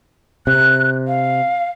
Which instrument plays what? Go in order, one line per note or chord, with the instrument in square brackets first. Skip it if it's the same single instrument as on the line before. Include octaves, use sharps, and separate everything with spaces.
[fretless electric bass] C3 [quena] F#6
[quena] F5